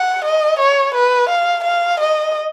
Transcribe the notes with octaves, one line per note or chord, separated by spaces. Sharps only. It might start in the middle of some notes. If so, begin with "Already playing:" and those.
Already playing: F#5
D#5
C#5
B4
F5
F5
D#5